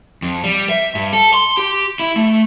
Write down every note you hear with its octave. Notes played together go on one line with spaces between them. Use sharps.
F2
G3
E5
G2
A4
C6
G4
E4
A3